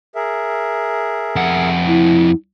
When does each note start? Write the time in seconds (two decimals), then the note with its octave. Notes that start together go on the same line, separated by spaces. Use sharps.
0.15 G#4 A#4 E5
1.36 F2 F#5
1.87 E4